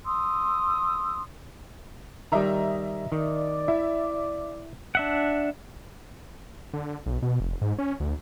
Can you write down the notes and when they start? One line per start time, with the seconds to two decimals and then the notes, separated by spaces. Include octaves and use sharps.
0.06 C6 D#6 E6
2.32 D#3 G3 D#5 E5 A#5
3.12 D#3 D5
3.68 E4 E5
4.95 D4 E5 F#5
6.73 D3
7.06 B1
7.22 B2
7.40 F1
7.62 G#2
7.79 C#4
8.00 D2